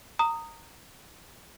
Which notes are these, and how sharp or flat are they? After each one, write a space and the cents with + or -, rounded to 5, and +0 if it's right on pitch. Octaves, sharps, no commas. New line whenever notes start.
A#5 -20 D#6 +0